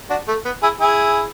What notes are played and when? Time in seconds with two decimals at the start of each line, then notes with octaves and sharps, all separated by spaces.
0.10 D4 F#4
0.28 A3
0.45 B3
0.62 E4 G#4
0.80 E4 G#4